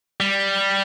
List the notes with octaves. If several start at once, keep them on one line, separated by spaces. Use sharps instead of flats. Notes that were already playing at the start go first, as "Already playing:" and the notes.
G3